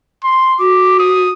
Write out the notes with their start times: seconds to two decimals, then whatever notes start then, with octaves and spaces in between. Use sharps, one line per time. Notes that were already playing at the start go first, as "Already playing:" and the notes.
0.24 C6
0.60 F#4 D6
0.99 D#6